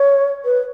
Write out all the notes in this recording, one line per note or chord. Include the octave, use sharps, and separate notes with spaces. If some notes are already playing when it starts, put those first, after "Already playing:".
Already playing: C#5
B4